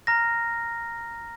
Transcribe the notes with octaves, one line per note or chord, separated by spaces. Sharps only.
A#5 F6 A#6